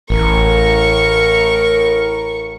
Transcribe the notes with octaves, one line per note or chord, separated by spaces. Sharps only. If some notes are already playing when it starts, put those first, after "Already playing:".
A1 A2 A#4 C#6